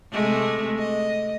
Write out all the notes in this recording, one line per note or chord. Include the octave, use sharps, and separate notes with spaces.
C3 G#3 A3
D#5